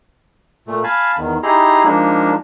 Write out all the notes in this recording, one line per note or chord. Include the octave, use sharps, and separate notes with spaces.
A#2 A3
F5 G#5 A5 B5
E2 D#3
D#4 E4 G4 G#4 A#5 C6
F3 G#3 A#3 D4 D#4